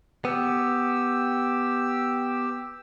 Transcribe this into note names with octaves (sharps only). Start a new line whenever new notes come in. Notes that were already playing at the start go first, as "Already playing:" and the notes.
B3 G4 E6